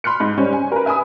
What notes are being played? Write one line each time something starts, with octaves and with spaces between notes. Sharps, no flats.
B5 C6 F6 F#6 C#7
G#2
G3 C#4 C5
G#5
A#4 B4
E5 G#5 B5 D#6